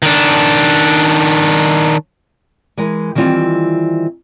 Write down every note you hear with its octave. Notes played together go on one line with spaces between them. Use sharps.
D#3 D4
E3 G#3 A#4
D#3 E3 G3 C4 F4